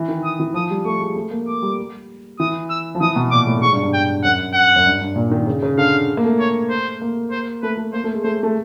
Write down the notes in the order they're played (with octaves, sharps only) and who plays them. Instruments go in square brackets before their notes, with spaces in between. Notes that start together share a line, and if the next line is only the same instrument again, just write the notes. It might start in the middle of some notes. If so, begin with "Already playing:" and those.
Already playing: [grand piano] E3
D#3
[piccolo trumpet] D#6
[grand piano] E3
[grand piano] F3 [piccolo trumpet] D#6
[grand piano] G3
[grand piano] A3 [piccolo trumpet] C#6
[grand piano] G#3
A3
A#3
[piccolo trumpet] D6
[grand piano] G3
[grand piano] E3 [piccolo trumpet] D#6
[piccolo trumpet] E6
[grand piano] F3
[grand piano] E3 [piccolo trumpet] D#6
[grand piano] B2
[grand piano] A#2 [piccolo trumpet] D6
[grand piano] A2
A2
[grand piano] G#2 [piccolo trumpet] C#6
[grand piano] G2
G2
[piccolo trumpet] G5
[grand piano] F#2 [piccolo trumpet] F#5
[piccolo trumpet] F#5
[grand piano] F#2
G2
G2
A#2
D#3
C#3
C#3
[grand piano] D3 [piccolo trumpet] F5
[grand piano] A#3
A3
[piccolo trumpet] C#5
C5
[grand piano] A#3
[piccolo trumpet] C5
[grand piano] A3 [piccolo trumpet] B4
[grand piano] A3
[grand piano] A#3 [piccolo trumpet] C5
[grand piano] A3
G#3
[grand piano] A3 [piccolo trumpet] C5
[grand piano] A3